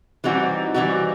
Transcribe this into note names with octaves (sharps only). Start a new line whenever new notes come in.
E3 G3 C4 D#4 F#4
E3 G3 C4 D#4 F#4